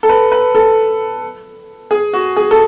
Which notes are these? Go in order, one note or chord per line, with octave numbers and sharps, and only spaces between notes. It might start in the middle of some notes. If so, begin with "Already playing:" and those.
A4
B4
B4
A4
G#4
F#4
G#4
A4